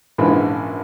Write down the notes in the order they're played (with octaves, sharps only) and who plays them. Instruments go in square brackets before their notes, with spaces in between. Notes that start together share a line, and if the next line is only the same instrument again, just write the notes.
[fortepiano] A#1 G#2 C#3 E3 B5